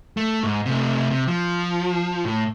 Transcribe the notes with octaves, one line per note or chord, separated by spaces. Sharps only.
A3
G#2
C3 A3
C3
F3
A2